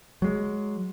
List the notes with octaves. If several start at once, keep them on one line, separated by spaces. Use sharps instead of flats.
F#3 G#3